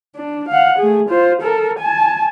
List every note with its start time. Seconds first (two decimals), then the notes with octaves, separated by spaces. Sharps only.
0.16 D4
0.49 F5 F#5
0.79 A3 G#4
1.09 F4 C5
1.42 A4 A#4
1.79 G#5 A5